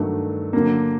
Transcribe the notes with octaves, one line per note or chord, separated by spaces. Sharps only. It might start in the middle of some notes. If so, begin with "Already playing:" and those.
Already playing: G2 D#3 F#3 A3 D4
D3 F#3 A#3